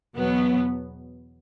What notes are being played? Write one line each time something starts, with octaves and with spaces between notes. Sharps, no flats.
E2 B2 F#3 B3